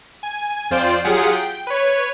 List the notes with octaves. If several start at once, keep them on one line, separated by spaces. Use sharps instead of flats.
G#5
F2 F4 C5 D5 G5
F#3 F4 G4 G#4 F#5
G5
B4 C#5